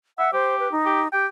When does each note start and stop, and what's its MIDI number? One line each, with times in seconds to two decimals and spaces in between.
0.18 0.31 76
0.18 0.32 78
0.33 0.73 67
0.33 0.58 72
0.59 0.71 71
0.72 1.08 63
0.85 1.02 67
1.13 1.27 67
1.13 1.26 79